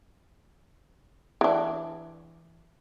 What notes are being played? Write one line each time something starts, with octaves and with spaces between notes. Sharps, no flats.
E3 D4